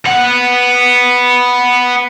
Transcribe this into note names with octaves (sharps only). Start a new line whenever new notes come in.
B3 F#5